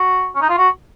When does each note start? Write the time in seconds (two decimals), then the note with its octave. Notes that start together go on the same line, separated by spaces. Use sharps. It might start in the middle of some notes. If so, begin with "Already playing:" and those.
Already playing: F#4
0.35 C#4
0.42 D#4
0.50 F4
0.58 F#4